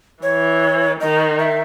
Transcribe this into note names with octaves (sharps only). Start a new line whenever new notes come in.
E3 C#5
D#3 D#5
E5